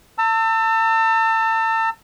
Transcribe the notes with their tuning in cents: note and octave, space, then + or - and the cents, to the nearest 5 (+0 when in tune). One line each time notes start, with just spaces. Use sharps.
A5 +35 E6 +0